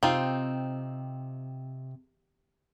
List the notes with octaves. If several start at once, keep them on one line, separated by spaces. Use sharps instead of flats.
C3 C4 D#4 F4